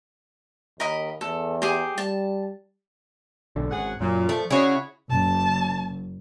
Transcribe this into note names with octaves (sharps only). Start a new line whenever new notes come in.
D#2 A#4 D#5 B5
E2 A4
G4 G#4
G3 A5
B1 D3
G#1 F#2 G#4 F#5
F#2 A#2 F#3
F3 A3
C#3 C#4 E4 F#4 G#4 C#5
F#1 A5